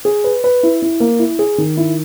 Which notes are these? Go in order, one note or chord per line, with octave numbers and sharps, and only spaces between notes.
G#4
B4
B4
E4
E4
A#3
E4
G#4
D#3
E4